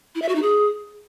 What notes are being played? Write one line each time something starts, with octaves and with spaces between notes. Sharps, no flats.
E4
E5
F#4
D#4
G#4